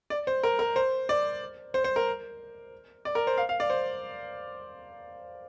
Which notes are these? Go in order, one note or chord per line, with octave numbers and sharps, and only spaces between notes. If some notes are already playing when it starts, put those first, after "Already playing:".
D5
C5
A#4
A#4
C5
D5
C5
C5
A#4
D5
A#4
C5
F5
F5
D5
C5